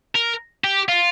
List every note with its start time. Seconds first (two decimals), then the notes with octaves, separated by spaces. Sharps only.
0.16 A#4
0.64 G4
0.89 F4